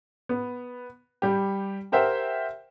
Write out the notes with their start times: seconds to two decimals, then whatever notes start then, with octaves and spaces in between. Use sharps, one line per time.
0.29 B3
1.22 G3 G4
1.92 G4 A#4 C5 E5 F#5 G5